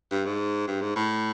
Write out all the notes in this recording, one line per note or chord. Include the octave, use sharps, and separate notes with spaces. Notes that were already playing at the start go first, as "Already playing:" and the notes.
G2
G#2
G2
G#2
A2